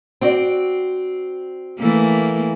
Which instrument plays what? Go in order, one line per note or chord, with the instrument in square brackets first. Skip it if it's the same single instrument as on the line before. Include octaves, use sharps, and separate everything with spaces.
[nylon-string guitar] C4 F#4 D5
[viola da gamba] E3 A3 A#3